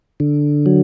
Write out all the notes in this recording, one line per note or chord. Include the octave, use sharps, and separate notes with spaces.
D3
F#3